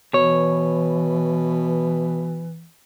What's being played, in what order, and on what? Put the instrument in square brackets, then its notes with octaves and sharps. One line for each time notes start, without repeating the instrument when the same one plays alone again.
[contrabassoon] B2 [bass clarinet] E3 [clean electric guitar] C#5